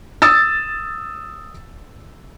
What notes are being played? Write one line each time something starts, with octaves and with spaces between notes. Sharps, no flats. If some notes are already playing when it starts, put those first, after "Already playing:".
D#6 E6 A6